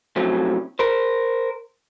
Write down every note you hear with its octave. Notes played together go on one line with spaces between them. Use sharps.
A2 C3 F3 F#3 C#4
A#4 C5